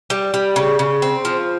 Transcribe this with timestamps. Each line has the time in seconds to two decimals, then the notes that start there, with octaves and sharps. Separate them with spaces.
0.10 G3
0.34 G3
0.56 C#3
0.79 C#3
1.02 C4
1.25 F3